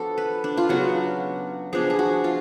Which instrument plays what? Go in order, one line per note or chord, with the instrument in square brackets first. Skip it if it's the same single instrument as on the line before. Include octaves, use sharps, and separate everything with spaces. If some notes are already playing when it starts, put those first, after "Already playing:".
Already playing: [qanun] F3 B3 D4 F#4 A4
B4
D4
F4
C#3 F#3 B3 D4 F#4
F3 B3 D4 G#4
G#4
F#4
F4